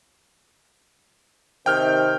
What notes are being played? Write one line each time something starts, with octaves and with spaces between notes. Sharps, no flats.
C3 D#3 G5 F6 G6